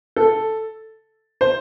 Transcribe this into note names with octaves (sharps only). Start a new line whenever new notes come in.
A4
C5